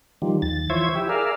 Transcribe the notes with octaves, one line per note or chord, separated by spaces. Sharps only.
D#3 F3 G3
D#2 A6
E3 F3 C5 C#5 E5 G#6
E4 G4 E5
G#4 A#4 D5 E5 F5